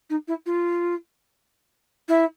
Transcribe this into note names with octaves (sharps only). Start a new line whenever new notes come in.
D#4
E4
F4
E4